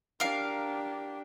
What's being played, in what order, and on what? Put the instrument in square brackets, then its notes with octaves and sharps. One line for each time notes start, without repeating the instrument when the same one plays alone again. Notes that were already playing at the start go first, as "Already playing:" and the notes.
[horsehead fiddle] D4 G4 [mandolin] A#4 F5